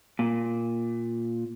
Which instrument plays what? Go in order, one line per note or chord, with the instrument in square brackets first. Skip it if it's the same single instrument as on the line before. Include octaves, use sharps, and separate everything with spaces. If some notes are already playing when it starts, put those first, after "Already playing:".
[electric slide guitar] A#2